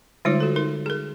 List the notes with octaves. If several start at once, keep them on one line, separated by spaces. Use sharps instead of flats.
D3 G3 G#3 D#4 F4 C#5
F#4 A4
D#4 A#4
G#4 A#4